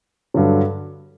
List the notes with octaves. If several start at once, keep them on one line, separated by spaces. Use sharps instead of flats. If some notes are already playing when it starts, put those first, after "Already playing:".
G2 D3 F#3